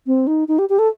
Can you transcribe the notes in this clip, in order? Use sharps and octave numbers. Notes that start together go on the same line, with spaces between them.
C4
D#4
D#4
G4
G4
A4